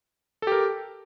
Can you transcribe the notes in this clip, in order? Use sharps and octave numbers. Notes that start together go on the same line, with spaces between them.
G4 A4 A#4